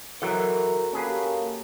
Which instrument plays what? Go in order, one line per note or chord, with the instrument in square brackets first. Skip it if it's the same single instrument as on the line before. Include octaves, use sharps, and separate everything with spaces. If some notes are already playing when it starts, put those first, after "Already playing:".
[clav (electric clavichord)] E3 F#3 [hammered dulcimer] F#4 [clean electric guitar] A4 F#5 A#5 [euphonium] A#4
[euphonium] A#3 [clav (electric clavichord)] C#4 G#4 B4 [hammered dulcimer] G4 C#5 A5